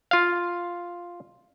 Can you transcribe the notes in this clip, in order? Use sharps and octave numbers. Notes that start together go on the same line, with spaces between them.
F4 F5